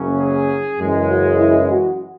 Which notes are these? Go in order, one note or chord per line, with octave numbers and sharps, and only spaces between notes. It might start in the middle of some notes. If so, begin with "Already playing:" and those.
Already playing: F#1 F#2 C#3 F#3 C#4
G#4
F#2 C#3 E3 G#3
F#4
E4
F#4